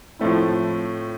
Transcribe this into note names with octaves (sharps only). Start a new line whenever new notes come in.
A2 F3 A3 C4 E4